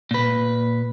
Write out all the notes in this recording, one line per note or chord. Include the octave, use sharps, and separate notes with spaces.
A#2 B4